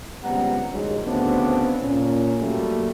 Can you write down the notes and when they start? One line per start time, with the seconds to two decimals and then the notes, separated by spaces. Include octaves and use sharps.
0.24 C#2 G3 B3 C4 F#5 A#5
0.72 A#1 D#2 F#3 G#3
1.05 D2 C#3 B3 C4 D4
1.82 A#2 C#4
2.39 F#3 G3 A3 A#3